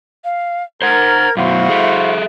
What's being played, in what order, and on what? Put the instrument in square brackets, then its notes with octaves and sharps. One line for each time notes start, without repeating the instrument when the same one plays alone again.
[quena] F5
[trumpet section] A#4 [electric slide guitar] C5 F#5 [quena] G#6
[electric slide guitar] F#2 B2 [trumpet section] E4 F#4 C5 [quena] F5
[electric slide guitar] G#4 A4 E5